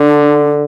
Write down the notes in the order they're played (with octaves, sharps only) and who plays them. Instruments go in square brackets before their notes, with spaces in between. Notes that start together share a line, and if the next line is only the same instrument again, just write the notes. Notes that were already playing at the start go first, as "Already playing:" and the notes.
Already playing: [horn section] D3 [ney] D4